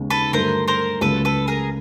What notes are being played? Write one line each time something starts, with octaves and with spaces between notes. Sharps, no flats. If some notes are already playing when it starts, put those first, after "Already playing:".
Already playing: D#2 C#3 G#3 B3
A4 B4
G2 D3 F#3 A3 A#4 C5
A#4 C5
C#2 C#3 F#3 A3 A4 B4
A4 B4
G#4 A#4